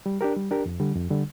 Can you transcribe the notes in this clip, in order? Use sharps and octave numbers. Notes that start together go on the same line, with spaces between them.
G3
D4 G4 A#4
G3
D4 G4 A#4
F2
D3 G3
F2
D3 G3